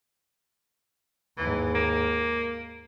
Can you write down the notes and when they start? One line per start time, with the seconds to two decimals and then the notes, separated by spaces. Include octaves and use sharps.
1.38 D#2 G#2 E3
1.75 A#3